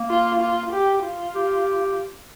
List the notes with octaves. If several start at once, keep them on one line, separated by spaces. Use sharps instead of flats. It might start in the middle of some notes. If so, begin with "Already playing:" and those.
Already playing: A#3
F4
F4
G4
F4
G4